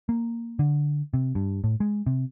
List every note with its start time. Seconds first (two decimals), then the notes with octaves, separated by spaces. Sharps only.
0.09 A#3
0.59 D3
1.14 C3
1.35 G2
1.64 A2
1.80 G#3
2.06 C3